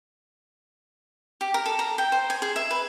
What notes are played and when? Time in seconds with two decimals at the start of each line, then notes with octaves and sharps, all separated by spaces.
1.41 G4
1.54 A#4
1.66 A4
1.79 A#5
1.98 G5
2.12 C5
2.30 G#5
2.42 G#4
2.56 E5
2.71 B4